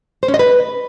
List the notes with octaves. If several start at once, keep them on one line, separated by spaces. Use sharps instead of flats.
C5
C#4
D#5
B4